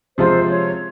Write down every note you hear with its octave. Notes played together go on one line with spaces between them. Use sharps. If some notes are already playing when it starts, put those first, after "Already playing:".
C3 F3 G#3 C4 F4 C5
C#5